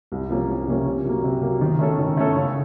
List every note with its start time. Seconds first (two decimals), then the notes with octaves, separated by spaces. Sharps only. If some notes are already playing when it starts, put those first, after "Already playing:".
0.12 C2
0.30 C3 F3 A#3 C#4
0.48 C2
0.67 C3 F3 A#3 C#4
0.86 C3
1.05 F#3 A#3
1.23 C3
1.42 F#3 A#3
1.61 D#3
1.79 A3 C#4 A4
1.99 D#3
2.17 A3 C#4 A4
2.36 C#3